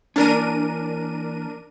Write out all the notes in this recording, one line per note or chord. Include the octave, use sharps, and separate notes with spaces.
E3 A#3 C#4 D4 A#4 D#7